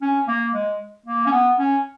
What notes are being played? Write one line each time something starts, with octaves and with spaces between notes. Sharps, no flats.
C#4
A#3
G#3
A#3
C#4
B3
C#4